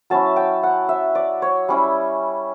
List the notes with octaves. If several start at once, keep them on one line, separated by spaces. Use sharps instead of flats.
F#3 C#4 E4 A5
G5
F#5
E5
D5
C#5
G3 C#4 E4